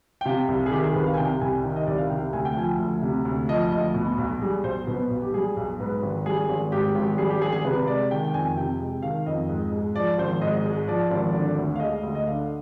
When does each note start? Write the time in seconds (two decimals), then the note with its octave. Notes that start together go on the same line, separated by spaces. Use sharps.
0.21 G5
0.26 C3 F5
0.48 C2
0.66 G#4
0.71 D#3 G4
0.83 G#4
0.95 C2 B4
1.07 F5
1.14 G#5
1.17 C3 G5
1.41 C2 G#5
1.63 D#3 G5
1.76 D#5
1.87 C2 D5
1.98 F5
2.10 C3 G5
2.33 D2 G#5
2.45 G5
2.56 F3 G#5
2.79 D2
3.02 C3
3.25 D2
3.49 F3 D#5
3.72 D2 D#5
3.94 B2
4.18 B1
4.42 G3 G#4
4.64 B1 C5
4.87 B2 B4
5.10 B1
5.22 G4
5.34 G3 G#4
5.57 B1
5.80 G#2 B4
6.02 G#1
6.26 G3 G#4
6.49 G#1
6.72 G#2 G4
6.95 G#1
7.18 G3 G#4
7.30 G4
7.41 G#1 G#4
7.53 G#4
7.65 C3 B4
7.87 G#3 D5
8.11 D#3 G5
8.25 G5
8.33 F2 G#5
8.57 C3 G5
8.80 G#3
9.02 D#3 F5
9.26 F2 D#5
9.49 G#2
9.73 G#3
9.95 F3 D5
10.18 G#1 C5
10.41 G#2 D#5
10.65 G#3
10.87 F3 D5
11.11 G#1
11.34 D3
11.58 D2
11.75 F5
11.80 G#3 D#5
12.03 D2
12.15 D#5
12.27 D3 F5